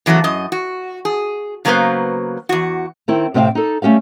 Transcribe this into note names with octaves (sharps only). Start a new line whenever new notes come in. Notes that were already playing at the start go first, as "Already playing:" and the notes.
C#3 E3 F#3 A3 B3
F#2 D#5
F#4
G#4
C#3 F#3 A#3 B3 B4 C5
E2 F#4
D#3 C4 E4
A2 C3 C4 D#5 F5 G5
D#4 A4
G3 A3 C#4 G4 F5